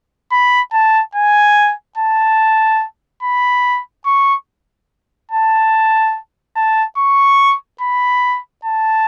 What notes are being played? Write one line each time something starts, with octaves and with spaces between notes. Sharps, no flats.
B5
A5
G#5
A5
B5
C#6
A5
A5
C#6
B5
A5